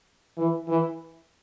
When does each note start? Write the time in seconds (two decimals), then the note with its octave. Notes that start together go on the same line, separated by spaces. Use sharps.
0.38 E3
0.68 E3